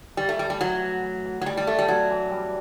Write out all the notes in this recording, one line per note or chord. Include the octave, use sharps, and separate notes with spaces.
E3 G3
A3
A2 G3
G3
A2 F#3
E3
E3
E3
F#3
G3 D4
G3
A3 D4
G3
F#3 B3
E3
G3